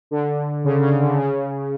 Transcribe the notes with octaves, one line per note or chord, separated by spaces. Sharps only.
D3
C#3
C#3
D3
C#3